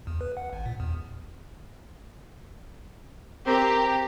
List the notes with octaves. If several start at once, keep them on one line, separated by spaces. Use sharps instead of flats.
E2
B4
F#5
G#1
A#2
E2
C4 G4 A#4 A#5